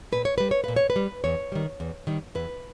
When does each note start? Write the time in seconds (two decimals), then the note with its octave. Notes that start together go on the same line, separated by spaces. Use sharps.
0.12 A#2 B4
0.25 C#5
0.38 G3 B4
0.51 C#5
0.64 A#2 B4
0.76 C#5
0.90 B4
0.96 G3
1.24 E2 C#5
1.52 D#3 G3
1.80 E2
2.07 D#3 G3
2.35 E2 B4